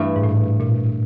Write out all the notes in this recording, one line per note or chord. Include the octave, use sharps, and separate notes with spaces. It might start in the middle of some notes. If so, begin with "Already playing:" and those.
Already playing: G2 E3 A3
G#2
A2
A#2